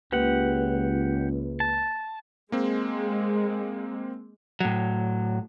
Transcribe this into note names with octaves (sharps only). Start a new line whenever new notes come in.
C#2 A#3 G4 B4 F#5
A5
G#3 A#3 C4
A2 F#3